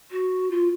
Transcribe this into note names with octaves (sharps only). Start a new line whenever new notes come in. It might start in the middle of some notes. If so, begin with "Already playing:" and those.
F#4
F4